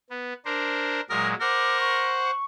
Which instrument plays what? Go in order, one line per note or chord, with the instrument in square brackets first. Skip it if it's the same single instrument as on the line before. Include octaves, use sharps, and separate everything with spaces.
[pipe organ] B3
D4 A#4 C5
[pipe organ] A#2 F#3 G#3 [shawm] A#4 [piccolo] D#6
[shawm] A#4 [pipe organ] C5 F#5 [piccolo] D6
[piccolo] C#6